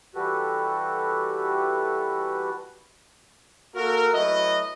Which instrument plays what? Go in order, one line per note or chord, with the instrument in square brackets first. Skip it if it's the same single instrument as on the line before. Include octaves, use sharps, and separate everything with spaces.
[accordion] E3 G3 F#4 G4 A4 B4
[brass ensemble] A#3 F#4 A4 A#4
F#3 A3 E4 F#4 B4 D#5